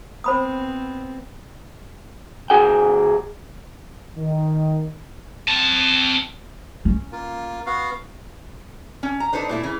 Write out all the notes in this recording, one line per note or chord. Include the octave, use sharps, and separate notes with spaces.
B3 C4 C5 B5 D#6
D2 F#4 G#4 G5
D#3
C4 A5
C#4
A#3 F4
B3 F#4 F5
C#4
A#5
D4 D#4 A4 B4 C5
A#2 A3 E4
C#3 E3